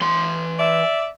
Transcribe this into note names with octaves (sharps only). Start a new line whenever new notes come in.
E3 C6
D5 E5